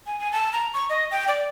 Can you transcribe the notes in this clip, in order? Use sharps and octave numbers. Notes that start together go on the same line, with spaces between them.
G#5
G#5
A5
A#5
C#6
D#5
G5
D5